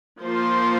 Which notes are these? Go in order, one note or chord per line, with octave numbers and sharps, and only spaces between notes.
F3 A#3 F4 C5